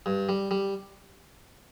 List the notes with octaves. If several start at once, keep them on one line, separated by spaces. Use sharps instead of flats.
G2
G3
G3